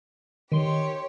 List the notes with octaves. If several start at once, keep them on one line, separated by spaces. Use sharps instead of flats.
D#3 G4 C#5 C6